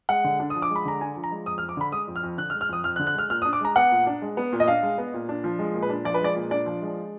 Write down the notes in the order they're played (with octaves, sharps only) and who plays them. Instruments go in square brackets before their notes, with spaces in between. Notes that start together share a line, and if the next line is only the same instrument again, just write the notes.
[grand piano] G#3 F#5
D3
D4
F3 D#6
D6
G#3
B5
D3 A#5
D4 G#5
F3
A#5
G#3
F2 D#6
F6
F2
D6
D3 B5
G#3 D#6
F2
F6
F2
D3 F#6
F6
G#3
F6
F2 D#6
F2 F6
F#6
D3
F#6
G#3 F6
A#2 F6
D#6
D4
D6
G#3 A#5
B3 F#5
A#2
D4
G#3
B3
A#2
D#5
D4 F5
G#3
B3
A#2
D4
F3
G#3
A#2
B4
D4
F3 D5
B4
G#3 D5
A#2
D4 D5
F3
G#3